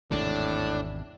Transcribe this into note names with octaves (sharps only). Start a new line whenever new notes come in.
G#1 E2 A2 C3 D4